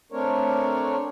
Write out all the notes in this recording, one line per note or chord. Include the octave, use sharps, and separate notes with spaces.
A3 C4 D4 A#4 C#5